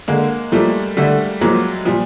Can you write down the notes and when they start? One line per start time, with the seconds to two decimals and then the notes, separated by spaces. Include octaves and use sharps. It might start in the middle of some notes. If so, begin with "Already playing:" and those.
0.08 D3 G#3 A#3
0.52 F3 G3 A3 A#3
0.97 D3 G3 A3
1.41 F3 F#3 G#3 A#3
1.85 A#2 F3 G3